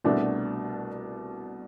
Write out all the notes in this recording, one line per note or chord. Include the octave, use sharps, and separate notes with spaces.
C2 B2 A3 D4 F#4